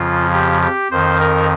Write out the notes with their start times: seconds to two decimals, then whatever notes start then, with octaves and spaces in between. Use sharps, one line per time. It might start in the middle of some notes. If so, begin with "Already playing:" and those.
Already playing: F2 C#3 F3 F4
0.33 G4
0.62 G4
0.91 F2 D#3 C5
1.20 A#4